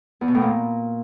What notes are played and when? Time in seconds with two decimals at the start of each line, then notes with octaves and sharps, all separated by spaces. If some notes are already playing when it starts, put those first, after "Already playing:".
0.21 E2
0.28 B2
0.35 A2
0.41 A#2